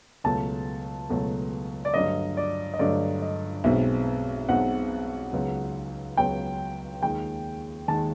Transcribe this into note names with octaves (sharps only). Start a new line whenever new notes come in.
C#2 B2 F#3 A3 A5
C#2 B2 F#3 A3
D5
G2 D3 F#3 A3 D#5
D5
D#5
G2 D3 F#3 A3 D5
D#5
B1 B2 G#3 C4 E5
B1 B2 G#3 C4 F#5
C#2 C#3 F#3 B3
C#2 C#3 F#3 B3 G5
D#2 D#3 G#3 G5
D#2 D#3 G#3 A5